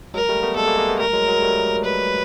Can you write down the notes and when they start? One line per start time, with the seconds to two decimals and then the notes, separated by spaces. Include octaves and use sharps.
0.14 F#3 G#3 A#4
0.29 G3 A3
0.43 A3 B3
0.56 G#3 A#3 A4
0.67 G#3 A#3
0.78 G#3 A#3
0.89 A3 B3
0.99 G3 A3 A#4
1.13 F#3 G#3
1.28 F#3 G#3
1.42 G3 A3
1.84 B4